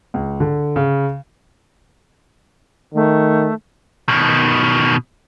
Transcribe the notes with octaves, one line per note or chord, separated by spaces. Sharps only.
C#2
D3
C#3
D#3 A3
B2 D#3